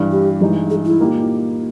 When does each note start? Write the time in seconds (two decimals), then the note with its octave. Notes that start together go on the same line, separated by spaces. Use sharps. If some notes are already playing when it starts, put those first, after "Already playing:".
Already playing: G2 E3 G3
0.11 G4
0.41 G2 E3 G#3 D#4
0.70 G#4
0.85 E4
1.00 A#2 A#3 D#4 G4